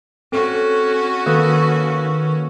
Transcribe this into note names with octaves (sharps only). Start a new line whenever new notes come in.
C4 C#4 F#4 A4
D#3 A#3 A4 B4